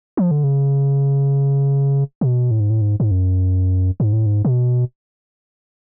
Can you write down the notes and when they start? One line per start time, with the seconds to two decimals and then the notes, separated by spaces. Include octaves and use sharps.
0.17 F3
0.31 D3
0.44 C#3
2.21 B2
2.51 A2
2.60 G#2
2.70 A2
2.81 G#2
3.00 G#2
3.11 F#2
4.00 G#2
4.13 A2
4.26 G#2
4.45 B2